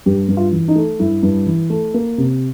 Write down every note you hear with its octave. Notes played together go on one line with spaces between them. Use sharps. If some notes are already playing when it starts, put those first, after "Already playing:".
G2 G4
G2
F4
E3
D#4
A3
G2 E4
G2
E3
A3
A#3
C3